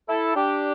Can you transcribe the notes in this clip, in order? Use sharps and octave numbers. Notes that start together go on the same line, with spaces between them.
E4 A4
D4 G4